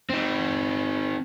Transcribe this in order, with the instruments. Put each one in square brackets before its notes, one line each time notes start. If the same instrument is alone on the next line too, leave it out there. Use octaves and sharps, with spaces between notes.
[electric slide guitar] C4 D#4